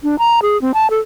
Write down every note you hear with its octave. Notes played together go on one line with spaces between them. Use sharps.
D4
A#5
G#4
C4
A5
A4